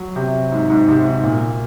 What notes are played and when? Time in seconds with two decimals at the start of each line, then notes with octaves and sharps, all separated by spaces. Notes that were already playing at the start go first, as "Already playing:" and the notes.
Already playing: F#3
0.16 C3
0.52 G#2
0.70 G#2
0.88 C3
1.06 G#2
1.24 A#2